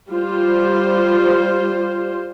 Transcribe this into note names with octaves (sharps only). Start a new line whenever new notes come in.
G3 F4 C5